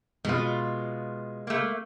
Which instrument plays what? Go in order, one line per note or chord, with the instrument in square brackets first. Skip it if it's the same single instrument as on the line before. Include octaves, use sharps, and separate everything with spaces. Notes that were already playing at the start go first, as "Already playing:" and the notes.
[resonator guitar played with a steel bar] B2 F4 [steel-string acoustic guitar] G#3
[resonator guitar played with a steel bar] A3 A#3